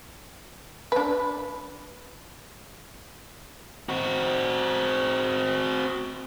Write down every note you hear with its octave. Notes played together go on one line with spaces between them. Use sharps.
D4 B4
C4 F#4